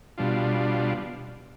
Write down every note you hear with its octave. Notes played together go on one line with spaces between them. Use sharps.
B2 G3 D4 F4